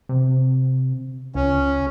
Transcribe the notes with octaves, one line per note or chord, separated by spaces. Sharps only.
C3
C#2 C#4